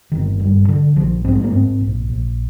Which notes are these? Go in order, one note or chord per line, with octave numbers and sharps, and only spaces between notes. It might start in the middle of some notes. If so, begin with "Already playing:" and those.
G1 D#3
G2
D3
A#1 F3
G#2 C4
G#3
A#3
G#2 C4
A#1
A#1